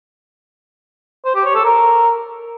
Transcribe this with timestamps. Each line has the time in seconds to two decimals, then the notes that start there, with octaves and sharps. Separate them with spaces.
1.25 C5
1.35 G4
1.45 C#5
1.55 A4
1.65 A#4